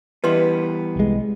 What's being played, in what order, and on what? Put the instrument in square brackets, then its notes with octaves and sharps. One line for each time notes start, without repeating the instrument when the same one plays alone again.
[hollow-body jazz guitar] E3 G3 B3 [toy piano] B4 D#5 C6
[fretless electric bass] C2 G#3